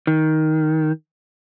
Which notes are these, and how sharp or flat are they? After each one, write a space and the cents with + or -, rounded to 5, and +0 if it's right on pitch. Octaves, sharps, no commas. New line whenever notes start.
D#3 +10